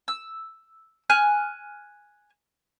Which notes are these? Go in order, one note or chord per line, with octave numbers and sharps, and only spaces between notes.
E6
G#5 F6 F#6